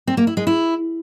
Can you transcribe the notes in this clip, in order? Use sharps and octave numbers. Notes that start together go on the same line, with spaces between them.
C4
A#3
E4
G#3
E4